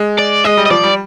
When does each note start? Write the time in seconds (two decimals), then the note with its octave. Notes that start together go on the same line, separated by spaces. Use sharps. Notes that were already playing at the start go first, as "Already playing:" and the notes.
Already playing: G#3
0.19 D5
0.44 G#3 D#5
0.57 G3
0.66 D#5
0.70 F3 D5
0.83 G3